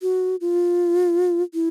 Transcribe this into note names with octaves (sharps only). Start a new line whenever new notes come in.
F#4
F4
E4